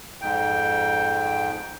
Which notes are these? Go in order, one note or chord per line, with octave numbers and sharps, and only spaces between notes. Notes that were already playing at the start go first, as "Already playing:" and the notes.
F2 G#2 G5